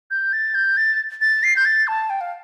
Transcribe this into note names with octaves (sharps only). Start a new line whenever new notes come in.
G6
A6
G6
A6
A6
C7
G6
A6
A5
G5
F5